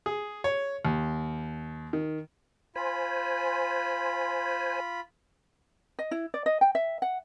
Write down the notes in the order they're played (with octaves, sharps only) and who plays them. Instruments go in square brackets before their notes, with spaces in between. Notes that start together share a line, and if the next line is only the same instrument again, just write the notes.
[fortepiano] G#4
C#5
D#2
D#3
[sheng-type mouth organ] F4 B5 [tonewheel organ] C5 G#5
[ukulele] D#5
E4
D5
D#5
G5
E5
F#5